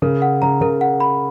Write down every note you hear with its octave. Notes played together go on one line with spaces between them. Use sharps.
C#3 A#4
F#5
C#3 A#5
C#3 A#4
F#5
B5